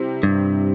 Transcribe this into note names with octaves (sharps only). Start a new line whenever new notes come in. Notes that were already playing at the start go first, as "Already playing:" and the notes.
Already playing: C3 G3 C4 E4
G2